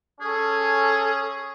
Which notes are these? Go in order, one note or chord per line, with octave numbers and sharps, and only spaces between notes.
C#4 G#4 A4